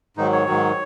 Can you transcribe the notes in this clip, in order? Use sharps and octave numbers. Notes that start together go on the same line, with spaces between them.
G#2 D#3 F#3 D#4
C#5
G#2 D#3 F#3